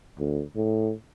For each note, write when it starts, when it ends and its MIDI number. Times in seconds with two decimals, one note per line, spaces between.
0.19 0.42 38
0.56 0.92 45